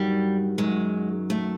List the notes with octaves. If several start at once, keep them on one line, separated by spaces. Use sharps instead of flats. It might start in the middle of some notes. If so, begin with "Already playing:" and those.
Already playing: G2 D#3 F#3 G3
F#2 D#3 F#3 G#3
A3